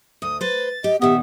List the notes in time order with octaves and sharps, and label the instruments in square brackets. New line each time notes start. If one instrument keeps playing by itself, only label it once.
[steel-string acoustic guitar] D2 [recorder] D#6
[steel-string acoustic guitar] B4 C5 [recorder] A6
[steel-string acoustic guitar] G4 [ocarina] D#5
[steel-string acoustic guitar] A#2 D#3 [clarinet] B3 [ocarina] G4 [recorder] E5